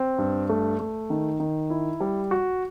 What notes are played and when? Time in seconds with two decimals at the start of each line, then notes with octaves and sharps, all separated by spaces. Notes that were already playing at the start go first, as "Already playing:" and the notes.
Already playing: C4
0.18 G2
0.49 A3
0.80 A3
1.10 D#3
1.40 D#3
1.70 E4
2.00 G3
2.31 F#4